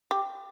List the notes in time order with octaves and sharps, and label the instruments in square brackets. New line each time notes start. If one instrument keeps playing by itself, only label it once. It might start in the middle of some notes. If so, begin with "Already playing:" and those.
[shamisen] G4